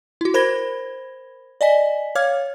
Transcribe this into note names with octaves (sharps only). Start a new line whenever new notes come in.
E4 F#4
A#4 C5 B5 G#6 A#6 G7
D5 D#5 G#5 B6
C#5 F5 D6 F6 G#6